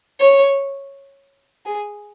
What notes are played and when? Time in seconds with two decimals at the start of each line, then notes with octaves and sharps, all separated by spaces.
0.20 C#5
1.66 G#4